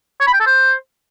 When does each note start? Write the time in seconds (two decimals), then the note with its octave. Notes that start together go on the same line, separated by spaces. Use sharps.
0.20 C#5
0.27 B5
0.33 G5
0.40 A4
0.46 C5